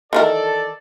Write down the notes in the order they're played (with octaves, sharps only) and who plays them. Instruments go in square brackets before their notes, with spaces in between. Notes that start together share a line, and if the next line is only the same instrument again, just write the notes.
[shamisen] D#3 E3 A#4 [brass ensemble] A4 D5